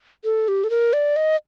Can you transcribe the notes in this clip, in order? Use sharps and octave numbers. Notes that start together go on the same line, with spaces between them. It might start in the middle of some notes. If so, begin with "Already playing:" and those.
A4
G4
A4
A#4
D5
D#5